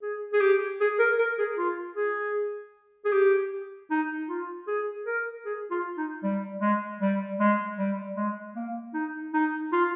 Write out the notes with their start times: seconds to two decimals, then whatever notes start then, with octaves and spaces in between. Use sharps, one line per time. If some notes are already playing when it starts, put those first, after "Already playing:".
0.02 G#4
0.33 G#4
0.41 G4
0.81 G#4
0.99 A#4
1.18 A#4
1.38 G#4
1.58 F4
1.96 G#4
3.05 G#4
3.12 G4
3.90 D#4
4.29 F4
4.67 G#4
5.06 A#4
5.45 G#4
5.71 F4
5.97 D#4
6.23 G3
6.61 G#3
7.01 G3
7.40 G#3
7.78 G3
8.17 G#3
8.55 A#3
8.94 D#4
9.33 D#4
9.72 F4